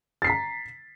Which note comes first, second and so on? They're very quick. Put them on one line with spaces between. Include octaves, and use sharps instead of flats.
A6 C7 B6 A#5